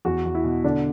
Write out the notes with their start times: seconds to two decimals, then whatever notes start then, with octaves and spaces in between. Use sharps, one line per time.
0.05 E2 F#4
0.25 E2
0.35 E4
0.44 B2
0.64 D3 D4